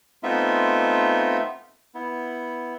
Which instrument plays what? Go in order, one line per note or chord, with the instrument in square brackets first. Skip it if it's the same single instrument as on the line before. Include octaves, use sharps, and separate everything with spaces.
[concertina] A3 B3 C4 D#4 F4 E5
B3 E4